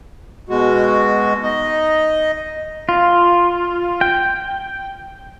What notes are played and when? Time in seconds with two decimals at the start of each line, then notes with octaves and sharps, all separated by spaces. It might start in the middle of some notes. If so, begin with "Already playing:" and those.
0.49 B2 G#3 F#4
1.43 D#4 D#5
2.89 F4
4.01 G5